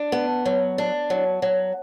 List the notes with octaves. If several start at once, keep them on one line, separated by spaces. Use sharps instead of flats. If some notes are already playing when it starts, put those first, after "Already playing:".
Already playing: D4
B3
F#3
D4
F#3
F#3